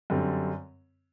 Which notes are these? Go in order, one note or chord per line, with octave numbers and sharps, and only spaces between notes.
F#2 D3 G3 C4